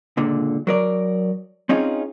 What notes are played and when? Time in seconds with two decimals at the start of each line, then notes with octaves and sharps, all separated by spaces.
0.17 C#2 A#2 D3
0.67 F#3 A#4 D5
1.69 C4 C#4 D#4 F4 G#4